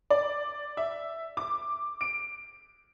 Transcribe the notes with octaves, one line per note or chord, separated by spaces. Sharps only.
D5
E5
D6
D7